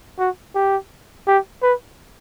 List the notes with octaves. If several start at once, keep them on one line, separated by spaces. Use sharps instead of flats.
F#4
G4
G4
B4